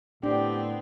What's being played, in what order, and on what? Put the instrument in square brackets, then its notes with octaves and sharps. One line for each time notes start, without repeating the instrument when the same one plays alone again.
[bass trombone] A2 [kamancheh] B3 C4 [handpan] D4 [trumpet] G4